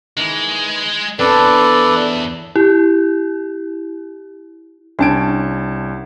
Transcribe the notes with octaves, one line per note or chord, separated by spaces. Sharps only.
D#3 E3 G#3
E2 C4 D4 A4 B4 D5
E4 G4 G6
C2 C#4 D4 G5 A5 G#6 D7